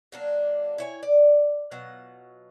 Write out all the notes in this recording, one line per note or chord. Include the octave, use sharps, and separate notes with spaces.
F#3 A#3 D4
E4 C#5 G#5
D5
B2 F#3 F4 F#5